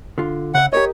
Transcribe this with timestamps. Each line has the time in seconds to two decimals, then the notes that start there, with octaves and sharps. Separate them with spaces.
0.18 D3 F4
0.54 C#3 E5 F#5
0.73 G4 A#4 C#5 D#5